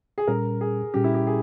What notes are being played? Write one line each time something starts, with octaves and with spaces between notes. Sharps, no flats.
G#4
A#2 G3 C#4 A#4
G#4
A#2 G3 C#4 G4
E4
G4
G#4